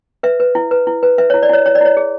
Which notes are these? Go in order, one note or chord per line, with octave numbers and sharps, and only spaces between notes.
B4 E5
B4
E4
B4
E4
B4
B4 E5
E4 C#5
D5
E4 C#5
E4 C#5
D5
E4 C#5
G#4